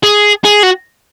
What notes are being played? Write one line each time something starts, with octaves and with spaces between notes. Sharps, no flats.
G#4
G#4
F#4